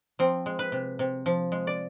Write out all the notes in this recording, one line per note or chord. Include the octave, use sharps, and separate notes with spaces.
F3 C4
G#3
B4
C3
C3
F3
G#3
D5